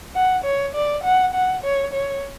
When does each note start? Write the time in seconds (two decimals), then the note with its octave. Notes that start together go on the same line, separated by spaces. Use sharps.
0.15 F#5
0.44 C#5
0.75 D5
1.04 F#5
1.34 F#5
1.64 C#5
1.93 C#5